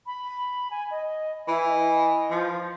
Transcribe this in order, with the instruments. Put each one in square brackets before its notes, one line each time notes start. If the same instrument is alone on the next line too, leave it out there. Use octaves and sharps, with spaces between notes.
[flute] B5
G#5
D#5
[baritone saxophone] E3 [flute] E4
[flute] D#5
[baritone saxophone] F3